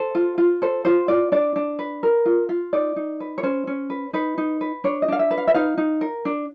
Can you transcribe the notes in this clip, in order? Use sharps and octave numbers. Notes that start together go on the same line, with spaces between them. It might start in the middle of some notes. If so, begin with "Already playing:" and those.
Already playing: A4 C5
F4
F4
A4 C5
F4 C5
F4 D5
D4 D5
D4
B4
A#4
F4
F4
D#4 D5
D#4
B4
C#5
C#4 C5
C#4
B4
D#4 B4
D#4
B4
D4 C#5
D#5
D4 F5
E5
B4
F5
E5
D#4 F5
D#4
A#4
D4